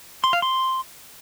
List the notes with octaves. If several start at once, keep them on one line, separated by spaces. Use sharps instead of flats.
C6
F5
C6